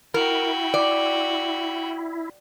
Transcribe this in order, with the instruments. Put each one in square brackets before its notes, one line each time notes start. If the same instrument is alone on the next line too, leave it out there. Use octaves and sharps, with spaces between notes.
[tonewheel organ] E4 [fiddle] F#4 G5 [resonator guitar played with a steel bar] A#4
[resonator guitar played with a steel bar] D5